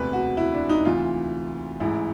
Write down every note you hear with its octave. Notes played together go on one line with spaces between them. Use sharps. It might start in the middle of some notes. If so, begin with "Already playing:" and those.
Already playing: E1 D2 C3 B4
F#4
E4
D4
D#4
D2 C3 E3 F4
A1 G#2 E3 E4